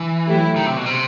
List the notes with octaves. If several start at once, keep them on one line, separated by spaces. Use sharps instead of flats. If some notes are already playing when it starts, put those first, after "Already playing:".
Already playing: E3
F#3 A3 E4 G4
D#3
C3
B2
C3